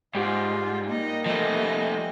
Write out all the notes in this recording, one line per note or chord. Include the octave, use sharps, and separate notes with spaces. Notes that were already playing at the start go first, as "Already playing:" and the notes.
G#2 G3 F4 G4 F#5
A#3 D#4
F3 A3 D#5